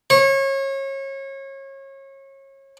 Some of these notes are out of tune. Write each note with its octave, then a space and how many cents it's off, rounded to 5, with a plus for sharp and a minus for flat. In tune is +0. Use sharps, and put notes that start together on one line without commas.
C#5 -30